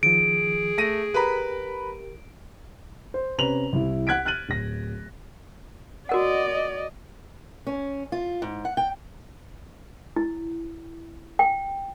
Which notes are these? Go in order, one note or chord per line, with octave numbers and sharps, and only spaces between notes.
D#3 F3 G#4 D7
A3 A#6 D#7
G4 A#4 B4 A#5 B5
C5
C3 C#4 B4 A#5 F7 F#7
C2 E4
F#5 F#6 G#6 B6 D7
F6 F#6 A6 D#7 F#7
D1 A#6
F#4 A#4 D5 D#5 F#5
C#4
F4
G#2
F#5
G5
E4
G5